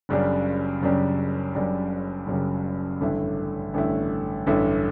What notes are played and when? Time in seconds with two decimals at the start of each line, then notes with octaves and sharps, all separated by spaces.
0.09 F#1 F#2 C#3 G3 D4
0.82 F#1 F#2 C#3 G3 D4
1.55 F#1 F#2 C#3 G3 D4
2.27 F#1 F#2 C#3 G3 D4
3.01 A1 G2 D3 A3 E4
3.74 A1 G2 D3 A3 E4
4.46 A1 G2 D3 A3 E4